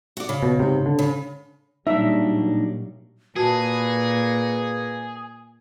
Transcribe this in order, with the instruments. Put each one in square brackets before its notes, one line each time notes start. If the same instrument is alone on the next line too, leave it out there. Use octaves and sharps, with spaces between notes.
[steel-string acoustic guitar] F#4 D5
C#3
[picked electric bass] B2
G#2 C3
D3
[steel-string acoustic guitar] C#3
[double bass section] A#2 F#3 G3 [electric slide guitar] A#3 D4 D#4 [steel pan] E5
[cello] A#2 [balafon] F#4 A5 [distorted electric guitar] G#4 [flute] B4